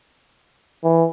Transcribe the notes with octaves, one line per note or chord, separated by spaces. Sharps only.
E3